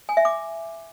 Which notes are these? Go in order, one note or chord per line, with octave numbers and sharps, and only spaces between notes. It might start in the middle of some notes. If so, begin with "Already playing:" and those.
G#5
E5
D6